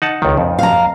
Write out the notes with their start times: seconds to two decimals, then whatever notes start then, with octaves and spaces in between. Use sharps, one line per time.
0.02 D#4 F#5 A5
0.22 C#2 D#3
0.37 F2
0.59 F5 A#5